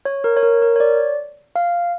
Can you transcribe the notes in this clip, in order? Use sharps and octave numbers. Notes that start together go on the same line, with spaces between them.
C#5
A#4
C#5
A#4
A#4
C#5
D5
F5